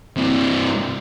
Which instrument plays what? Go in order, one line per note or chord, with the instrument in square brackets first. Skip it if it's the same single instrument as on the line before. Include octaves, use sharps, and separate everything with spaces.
[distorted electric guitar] G2 C3